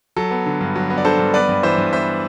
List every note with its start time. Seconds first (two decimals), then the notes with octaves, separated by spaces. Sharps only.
0.16 F#3 A4
0.31 B3
0.46 D3
0.61 G2
0.75 F#3
0.90 B3
0.98 D5
1.05 D3 A4 C5
1.19 G2
1.34 B3 B4 D5
1.49 G2
1.63 E3 C5 E5
1.78 G2
1.93 B3 C5 E5